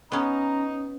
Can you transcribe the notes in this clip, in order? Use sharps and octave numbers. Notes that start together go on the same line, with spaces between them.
B3 C#4 D#4 A#5